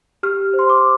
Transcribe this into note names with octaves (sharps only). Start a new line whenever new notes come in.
G4 F6
C5
C6
D6